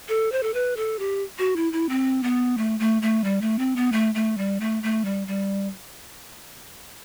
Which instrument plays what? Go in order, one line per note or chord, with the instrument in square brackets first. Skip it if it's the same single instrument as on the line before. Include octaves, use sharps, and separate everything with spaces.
[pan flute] A4
C5
A4
B4
A4
G4
F#4
E4
E4
C4
B3
A3
A3
A3
G3
A3
C4
B3
A3
A3
G3
A3
A3
G3
G3